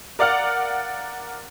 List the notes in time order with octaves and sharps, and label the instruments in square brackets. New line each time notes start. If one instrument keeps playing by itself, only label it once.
[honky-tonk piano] A#4 D5 F5 F#5 F6